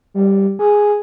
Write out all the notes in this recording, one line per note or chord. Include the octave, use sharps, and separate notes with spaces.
G3
G#4